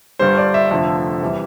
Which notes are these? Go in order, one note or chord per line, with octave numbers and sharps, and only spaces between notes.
G1 G2 D3 G3 C5
D5
E5
F1 F2 D3 F3 A3 E5
E2 C3 E3 G3